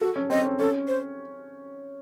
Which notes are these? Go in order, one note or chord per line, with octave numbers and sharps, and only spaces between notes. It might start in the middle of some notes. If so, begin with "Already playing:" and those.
F#4 A4
C#4
C4 D#5
C#4
C#4 A4
C5